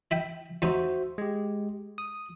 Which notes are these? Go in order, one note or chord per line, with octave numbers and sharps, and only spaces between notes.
E4 E5 G5
D#2 D#4 F#4 C5 E5
G#3 G4
D#6